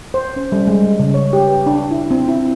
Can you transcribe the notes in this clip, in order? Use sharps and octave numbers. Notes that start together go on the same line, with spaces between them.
C5
C#4
G3
G#3
C#3
C#5
G4
B4
D4
E4
C4
E4